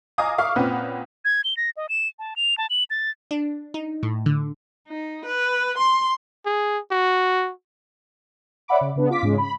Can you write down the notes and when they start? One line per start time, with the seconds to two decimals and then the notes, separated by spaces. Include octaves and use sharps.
0.18 D#5 F5 G#5 A#5 D6 D#6
0.38 E5 F5 C#6 D6 F6
0.56 A#2 C4 C#4 B4 F#5
1.25 G#6
1.44 G7
1.57 A#6
1.77 D#5
1.89 E7
2.19 A5
2.36 F7
2.58 A5
2.70 F#7
2.90 A6
3.31 D4
3.74 D#4
4.03 A2
4.26 D3
4.88 D#4
5.26 B4
5.78 C6
6.46 G#4
6.91 F#4
8.68 C#5 D5 E5 F#5 B5 D6
8.81 C#3
8.96 C#3 B3 D4
9.10 F4 D6 B6
9.23 G#2 C#3 G#3 C#4
9.38 B5